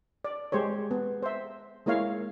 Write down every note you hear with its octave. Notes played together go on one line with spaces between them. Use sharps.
D5
G#3 G4 C5 C#5
B3
C5 E5
G#3 A#3 E4 C#5 F5